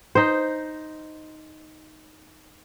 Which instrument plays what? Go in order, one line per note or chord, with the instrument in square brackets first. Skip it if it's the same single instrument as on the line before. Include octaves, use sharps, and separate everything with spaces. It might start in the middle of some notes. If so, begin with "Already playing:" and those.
[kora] D#4 C5